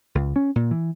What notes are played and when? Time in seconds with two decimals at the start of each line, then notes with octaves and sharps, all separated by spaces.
0.15 C#2
0.36 C#4
0.56 A#2
0.71 E3